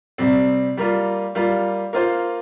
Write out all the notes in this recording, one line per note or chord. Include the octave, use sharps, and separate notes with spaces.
C3 G3 C4
G3 A#3 F4
G3 A#3 F4
A#3 F4 C5